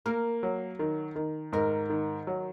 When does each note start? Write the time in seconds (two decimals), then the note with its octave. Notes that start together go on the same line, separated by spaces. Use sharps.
0.06 A#3 A#4
0.43 F#3
0.79 D#3
1.16 D#3
1.52 G#2 A#4
1.90 D#3
2.27 F#3